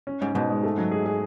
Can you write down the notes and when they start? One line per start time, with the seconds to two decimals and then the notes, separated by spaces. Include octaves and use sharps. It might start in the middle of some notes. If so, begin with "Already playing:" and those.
0.07 C#4
0.21 G#2 C#4
0.35 G#2 B2
0.50 G#3
0.63 A3
0.78 F#3
0.91 G#4
1.06 G#4